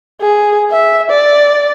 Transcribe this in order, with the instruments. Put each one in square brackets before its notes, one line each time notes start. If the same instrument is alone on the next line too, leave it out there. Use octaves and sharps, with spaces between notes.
[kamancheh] G#4
E5
D5